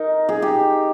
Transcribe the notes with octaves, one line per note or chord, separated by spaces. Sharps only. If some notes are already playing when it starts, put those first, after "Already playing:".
Already playing: D#4 A#4
G#4
G4